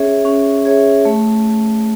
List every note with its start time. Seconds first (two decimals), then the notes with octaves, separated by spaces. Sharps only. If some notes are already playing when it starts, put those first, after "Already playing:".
Already playing: C#4 G#4 C#5 E5
0.25 C#4
0.65 G#4 C#5 E5
1.05 A3